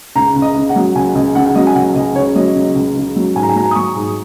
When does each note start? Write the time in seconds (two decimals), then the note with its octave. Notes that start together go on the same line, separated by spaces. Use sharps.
0.16 C#2 A#5
0.35 C#2
0.42 D#5
0.56 C#3
0.69 F#5
0.76 F#3
0.95 C#2 G#5
1.15 C#2 D#5
1.35 C#3 F#5
1.46 F#5
1.55 F#3 D#5
1.67 G#5
1.75 C#2 F#5
1.95 C#2 D#5
2.15 C#3 C#5
2.35 F#3 D#5
2.56 C#2
2.75 C#2
2.96 C#3
3.16 F#3
3.35 G#2 G#5
3.43 A#5
3.49 G#5
3.56 F#3 A#5
3.64 G#5
3.71 D#6
3.75 F#3 C#6
3.95 G#2